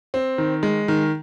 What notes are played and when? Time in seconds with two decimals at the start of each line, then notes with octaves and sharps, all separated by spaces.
0.14 C4
0.38 D#3
0.63 G#3
0.88 D#3